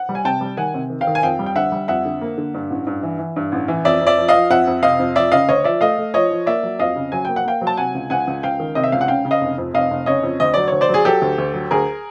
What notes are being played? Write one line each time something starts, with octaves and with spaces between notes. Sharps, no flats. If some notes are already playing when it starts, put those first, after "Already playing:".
Already playing: F#5
G3
G#5
C3 G5 A5
G3
D#3 F#5 G#5
C3
D#3
F5 G5
D#3
G#5
F2 F5 G5
G3
G5
D3 E5 F#5
G3
F2 E5 F#5
D3
A#3
D3
G2
A1
G2
E3
E3
G2
A1
E3
F2 D5 E5
F2
D5 E5
F3
D#5 F5
F3
F2 E5 F#5
F2
C3 D#5 F5
F2
F3 D5 E5
C#3 D#5 F5
D2 C#5 D#5
F3 D5 E5
A3 D#5 F5
A3
F3 C#5 D#5
F3
A#3 D5 E5
F#3
F2 D#5 F5
C#3
F#3 G#5
A#3 G5
F#5
A#3 F5 G5
F#3
A5
C3 F#5 G#5
C#2
C#2 F#5 G#5
C#2
C#2 F5 G5
D#3
C3 D#5
E5
C#2 F5
F#5
C#3 F5 G5
C#3
D#5 F5
F1
F2
F1 D#5 F5
F1
C#3 C#5 D#5
F2
D2 D#5
F#3 D5
D2 C#5
C5 D5
F#3 G#4
F#3 G4 A4
D2
D2
F#3
D2 G#4 A#4